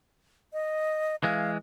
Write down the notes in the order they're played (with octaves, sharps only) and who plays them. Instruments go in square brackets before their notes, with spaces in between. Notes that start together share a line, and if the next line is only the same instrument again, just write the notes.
[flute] D#5
[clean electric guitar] E3 G#3 [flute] F5